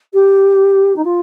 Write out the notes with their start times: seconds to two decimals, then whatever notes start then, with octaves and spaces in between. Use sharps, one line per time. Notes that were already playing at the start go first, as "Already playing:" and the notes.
0.13 G4
0.96 D#4
1.04 F4